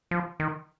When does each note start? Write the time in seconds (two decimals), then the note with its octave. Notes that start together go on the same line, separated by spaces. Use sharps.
0.11 F3
0.40 D#3